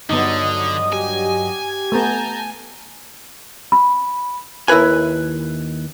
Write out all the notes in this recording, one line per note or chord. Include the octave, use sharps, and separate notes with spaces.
G2 D3 F#3 B3 D#4 D#5 D#6
G4 G#5
A3 B3 A5 A#5 G6
B5
D#2 E4 A#4 B4 G#5